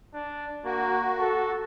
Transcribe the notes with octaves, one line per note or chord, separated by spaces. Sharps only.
D4
A#3 F#4
A4